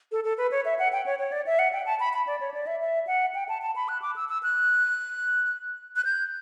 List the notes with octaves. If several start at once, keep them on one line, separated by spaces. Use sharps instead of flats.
A4
A4
B4
C#5
E5
F#5
G5
C#5
C#5
D5
E5
F#5
G5
A5
B5
B5
D5
C#5
D5
E5
E5
F#5
G5
A5
A5
B5
F#6
D6
E6
E6
F#6
F#6
G6